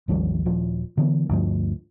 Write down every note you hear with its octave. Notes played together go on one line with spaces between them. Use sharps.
G#1 D#2 F3 G3
D#1 F3
D3 E3 B3
D2 G2 F3